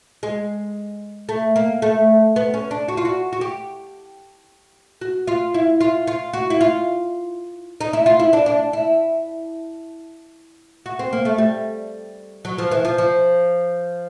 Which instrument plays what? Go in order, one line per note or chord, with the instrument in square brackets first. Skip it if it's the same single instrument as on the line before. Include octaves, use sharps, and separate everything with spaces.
[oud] G#3
A3
A#3
A3
B3
C#4
D4
F#4
F4
F#4
F#4
G4
F#4
F4
E4
F4
F4
F#4
E4
F4
D#4
E4
F4
E4
D4
D4
E4
F#4
C4
A#3
A3
G3
F#3
F3
E3
F3
F3